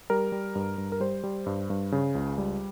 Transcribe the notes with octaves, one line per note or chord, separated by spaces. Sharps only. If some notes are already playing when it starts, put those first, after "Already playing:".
G3 A#4
G3
G2
G2
A#4
G3 C5
G3
G2
G2
C#3
C#2
G3